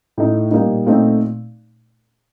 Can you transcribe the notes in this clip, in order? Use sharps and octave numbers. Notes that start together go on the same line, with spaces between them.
A2 A3 D#4
A#2 G3 A#3 D#4
A#2 A3 C4 D#4